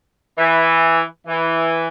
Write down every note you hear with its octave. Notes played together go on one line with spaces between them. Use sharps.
E3
E3